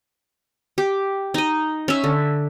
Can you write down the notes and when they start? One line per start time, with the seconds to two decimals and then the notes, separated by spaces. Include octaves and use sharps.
0.78 G4
1.34 D#4 D#5
1.88 C#4 E5
2.04 D3